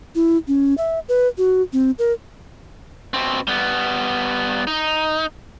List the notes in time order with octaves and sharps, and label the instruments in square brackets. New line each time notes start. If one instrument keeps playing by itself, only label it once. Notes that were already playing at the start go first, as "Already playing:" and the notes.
[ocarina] E4
C#4
E5
B4
F#4
C4
A#4
[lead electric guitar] B2 C4
G3 B3
D#4